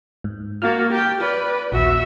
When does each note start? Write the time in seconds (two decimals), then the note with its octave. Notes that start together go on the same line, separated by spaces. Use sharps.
0.24 G#2
0.62 A#3 F#4 F6 A6
0.91 G4 G5
1.21 B4 D5
1.72 A#1 D#2 F#4 E5